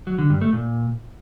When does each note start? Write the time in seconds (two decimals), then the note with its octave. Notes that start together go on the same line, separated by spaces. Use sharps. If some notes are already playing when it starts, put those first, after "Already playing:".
0.07 F#3
0.18 D3
0.30 G2
0.41 A3
0.53 A#2